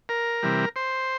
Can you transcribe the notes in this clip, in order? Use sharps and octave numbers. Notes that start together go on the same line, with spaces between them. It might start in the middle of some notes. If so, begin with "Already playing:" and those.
A#4
C3 E3 G3
C5